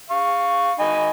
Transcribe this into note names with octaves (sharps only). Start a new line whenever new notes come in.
F5 C#6
D#4 G#5 B5